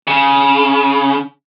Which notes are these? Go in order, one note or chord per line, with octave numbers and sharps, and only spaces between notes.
C#3